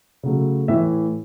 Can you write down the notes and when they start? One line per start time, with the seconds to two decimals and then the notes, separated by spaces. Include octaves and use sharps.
0.23 C#3 F#3 A3
0.68 A2 E3 E5